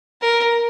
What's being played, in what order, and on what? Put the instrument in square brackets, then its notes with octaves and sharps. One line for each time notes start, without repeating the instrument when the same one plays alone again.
[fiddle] A#4